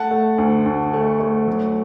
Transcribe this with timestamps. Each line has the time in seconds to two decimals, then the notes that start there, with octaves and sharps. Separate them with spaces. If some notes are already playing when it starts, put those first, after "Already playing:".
Already playing: A3 F#5 A5
0.11 A3
0.38 D2
0.66 D2
0.93 A3
1.20 A3
1.48 F#3